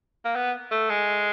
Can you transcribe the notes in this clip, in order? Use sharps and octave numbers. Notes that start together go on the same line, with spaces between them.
A#3
B3
A3
G#3